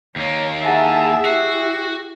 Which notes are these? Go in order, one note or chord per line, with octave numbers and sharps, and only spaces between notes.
D#2 A#3 C#5
E4 G#4 E5 F#5 G#5 A5
E4 F#4 G4 C7